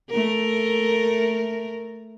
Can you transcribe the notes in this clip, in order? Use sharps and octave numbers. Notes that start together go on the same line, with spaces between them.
A3 A#4